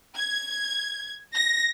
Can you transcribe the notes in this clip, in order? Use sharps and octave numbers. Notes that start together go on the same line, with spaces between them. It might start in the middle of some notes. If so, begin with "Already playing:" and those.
G#6
A#6